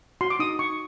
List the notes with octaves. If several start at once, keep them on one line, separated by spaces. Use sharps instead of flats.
F#4 C6
D6
D#4 D#6
D#4 C#6